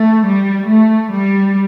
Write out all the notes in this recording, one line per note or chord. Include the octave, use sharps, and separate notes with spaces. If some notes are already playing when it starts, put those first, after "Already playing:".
Already playing: A3
G3
A3
G3